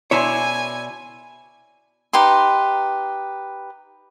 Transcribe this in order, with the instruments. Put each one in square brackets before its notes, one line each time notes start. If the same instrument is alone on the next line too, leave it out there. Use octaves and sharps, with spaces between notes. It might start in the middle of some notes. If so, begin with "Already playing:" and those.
[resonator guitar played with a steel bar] B2 E4 D5 [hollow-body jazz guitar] C#5 B5 C6 [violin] G#5
[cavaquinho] D#4 G4 B4 C6